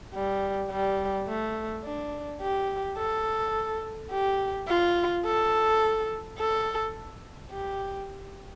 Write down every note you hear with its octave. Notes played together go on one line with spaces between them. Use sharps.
G3
G3
A3
D4
G4
A4
G4
F4
A4
A4
G4